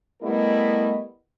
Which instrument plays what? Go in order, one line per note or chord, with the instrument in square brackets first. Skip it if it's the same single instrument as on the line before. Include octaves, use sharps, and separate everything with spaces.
[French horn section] G3 A3 B3 E4 A#4 D#5